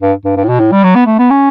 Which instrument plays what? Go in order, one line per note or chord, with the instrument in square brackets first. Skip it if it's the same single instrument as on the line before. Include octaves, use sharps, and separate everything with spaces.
[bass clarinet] G2
G2
G2
A2
B2
A2
G3
F#3
B3
A3
B3
C#4